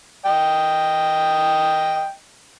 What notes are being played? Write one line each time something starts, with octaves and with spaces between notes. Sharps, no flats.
D#5 G5